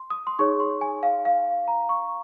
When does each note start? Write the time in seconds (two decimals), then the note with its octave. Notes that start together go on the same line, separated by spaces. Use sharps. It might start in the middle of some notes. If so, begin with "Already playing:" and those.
Already playing: C6
0.10 D#6
0.27 C6
0.39 D#4 G#4 C#5 C#6
0.60 C6
0.81 G#5
1.03 F5
1.25 F5
1.68 A#5
1.89 C#6